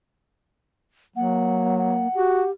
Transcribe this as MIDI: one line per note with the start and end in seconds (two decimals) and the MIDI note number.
1.16 2.06 54
1.16 2.08 58
1.16 1.78 78
1.78 2.48 78
2.15 2.43 66
2.15 2.51 67